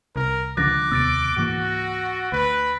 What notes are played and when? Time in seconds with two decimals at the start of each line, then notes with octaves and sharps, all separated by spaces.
0.16 C2 A#4
0.57 C#2 D3 D#3 F3 D6 F#6 A6 A#6
0.91 D#2 C3 B3 E6 A6 D7
1.37 G#2 E3 A#3 F#4
2.32 D2 B4